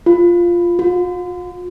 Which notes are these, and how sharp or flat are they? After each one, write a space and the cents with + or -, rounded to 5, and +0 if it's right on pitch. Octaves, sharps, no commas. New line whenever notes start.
F4 -5
F4 +45